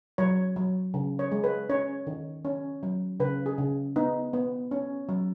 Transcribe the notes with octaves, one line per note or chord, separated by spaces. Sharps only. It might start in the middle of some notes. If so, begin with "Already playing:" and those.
F#3 C#5
F#3
C#3
C#5
G#3
B4
C#4 C#5
D#3
C#4
F#3
C#3 B4
G#4
C#3
B3 D#4
B3
C#4
F#3